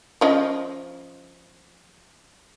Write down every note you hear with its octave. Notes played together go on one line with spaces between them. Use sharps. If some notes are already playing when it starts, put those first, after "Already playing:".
F3 C#4 D#5